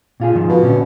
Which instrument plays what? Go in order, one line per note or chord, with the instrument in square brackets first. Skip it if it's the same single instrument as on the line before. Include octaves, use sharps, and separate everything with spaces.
[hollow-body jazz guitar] A#2 F4 G#4
G#2 D#3 F3
[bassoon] B2 [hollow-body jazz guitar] F4
[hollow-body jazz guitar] A#2 D3 C#4